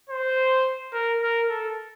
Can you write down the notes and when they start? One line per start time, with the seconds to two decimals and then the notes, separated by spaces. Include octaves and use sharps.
0.09 C5
0.93 A#4
1.22 A#4
1.49 A4